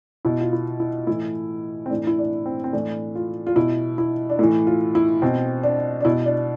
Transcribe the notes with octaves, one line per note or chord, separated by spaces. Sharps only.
B2 E4
F4
E4
E4
A2 E3 E4
C4
A2 E3 D4
E4
D4
C4
C4
A2 E3 D4
F4
F4
B2 E4
E4
D4
A2 E3 E4
F4
E4
B2 C4
D4
D4
B2 E4
D4